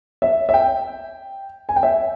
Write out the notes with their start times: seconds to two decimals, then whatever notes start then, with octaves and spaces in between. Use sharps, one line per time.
0.22 E5
0.49 E5
0.54 G5
1.69 G#5
1.76 G5
1.83 E5